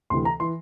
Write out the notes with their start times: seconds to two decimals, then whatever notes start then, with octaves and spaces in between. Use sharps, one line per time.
0.10 D2 C3 E3 C6
0.25 A#5
0.40 E3 C6